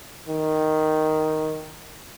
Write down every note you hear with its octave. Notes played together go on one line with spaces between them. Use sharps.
D#3